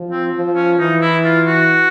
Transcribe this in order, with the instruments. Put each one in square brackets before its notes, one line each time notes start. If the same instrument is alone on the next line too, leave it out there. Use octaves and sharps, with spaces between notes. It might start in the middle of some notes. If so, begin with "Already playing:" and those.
Already playing: [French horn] F3
[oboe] C4
[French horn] F3
[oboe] C#4
[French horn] E3 [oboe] D#4
[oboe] E4
F4
F#4